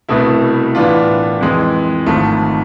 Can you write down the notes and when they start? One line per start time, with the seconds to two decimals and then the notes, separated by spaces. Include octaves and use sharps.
0.09 C2 B2 A3 E4
0.75 A2 E3 B3 D4 F4
1.41 F2 E3 G#3
2.06 G#1 G#2 F3 A3